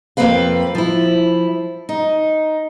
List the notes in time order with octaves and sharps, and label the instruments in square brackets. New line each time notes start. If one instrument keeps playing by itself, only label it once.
[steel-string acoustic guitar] F2 D3 A#3 C4 B4 F5
F3 E4
D#4